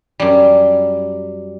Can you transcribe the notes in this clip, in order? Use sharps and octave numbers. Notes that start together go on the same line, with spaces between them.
F#2 G3